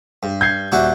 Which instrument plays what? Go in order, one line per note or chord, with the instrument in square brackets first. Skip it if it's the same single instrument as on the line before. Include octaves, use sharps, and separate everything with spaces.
[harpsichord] G2
[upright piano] G6 G#6 C7
[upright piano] D#1 [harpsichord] D4 E4 F#4